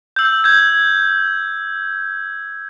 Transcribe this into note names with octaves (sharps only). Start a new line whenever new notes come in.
E6 G6
G6 G#6